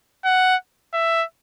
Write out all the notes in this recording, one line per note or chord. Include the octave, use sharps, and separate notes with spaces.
F#5
E5